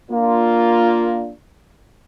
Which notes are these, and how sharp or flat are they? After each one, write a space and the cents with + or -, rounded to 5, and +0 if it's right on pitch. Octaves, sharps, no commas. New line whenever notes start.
A#3 +0 D4 -5 F4 +0